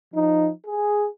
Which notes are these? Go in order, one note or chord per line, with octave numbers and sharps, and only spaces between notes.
F3 D#4
G#4